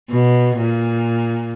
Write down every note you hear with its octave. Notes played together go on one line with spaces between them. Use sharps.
B2
A#2